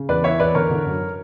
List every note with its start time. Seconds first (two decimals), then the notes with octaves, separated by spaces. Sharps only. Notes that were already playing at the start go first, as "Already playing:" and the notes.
Already playing: C#3
0.09 E2 B4 D5
0.24 E3 C#5 E5
0.40 E2 B4 D5
0.55 D3 A#4 C#5
0.70 D3
0.86 F#2